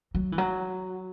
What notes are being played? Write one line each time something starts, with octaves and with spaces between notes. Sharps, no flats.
F#3
E3
F#3